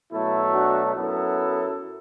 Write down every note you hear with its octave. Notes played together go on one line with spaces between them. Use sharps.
B2 F#3 A3 E4 A4
D4 F#4
F#2 F#3 B3 E4 A4